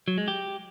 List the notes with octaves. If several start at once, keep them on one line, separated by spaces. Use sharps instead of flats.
F#3
G#3
G4